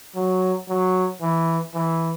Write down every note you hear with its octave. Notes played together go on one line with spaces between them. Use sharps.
F#3
F#3
E3
E3